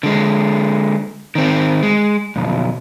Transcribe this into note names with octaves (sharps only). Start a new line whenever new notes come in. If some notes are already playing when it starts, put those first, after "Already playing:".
D3 G#3
D#3 C4
G#3
B1 F2